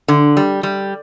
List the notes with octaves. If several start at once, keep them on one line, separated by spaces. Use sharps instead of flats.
D3
G3
G3